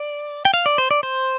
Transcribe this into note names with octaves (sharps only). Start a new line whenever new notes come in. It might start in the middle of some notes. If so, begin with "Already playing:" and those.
Already playing: D5
G5
F5
D5
C5
D5
C5